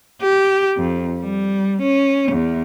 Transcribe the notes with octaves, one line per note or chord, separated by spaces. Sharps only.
G4
F2
G3
C#4
E2